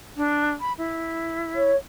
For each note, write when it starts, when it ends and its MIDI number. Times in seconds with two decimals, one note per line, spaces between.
0.17 0.50 62
0.61 0.73 83
0.78 1.70 64
1.55 1.76 73